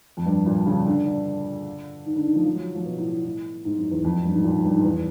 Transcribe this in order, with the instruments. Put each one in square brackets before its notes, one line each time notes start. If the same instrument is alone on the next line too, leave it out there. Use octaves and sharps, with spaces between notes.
[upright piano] F2
G2
A#2
C#3
D3
D3
D#3
D3
D#3
F3
F3
F#3
F3
B2
A2
A2
A2
G#2
F#2
E2
F2
F#2
G2
G#2
A#2
F#2
G2
G#2
E2